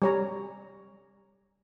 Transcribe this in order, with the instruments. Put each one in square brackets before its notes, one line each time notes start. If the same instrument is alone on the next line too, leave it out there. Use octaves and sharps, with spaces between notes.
[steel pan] G3 C#5 A#5